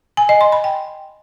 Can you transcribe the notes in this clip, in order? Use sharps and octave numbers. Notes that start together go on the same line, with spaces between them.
G#5
D#5
C6
B5
G5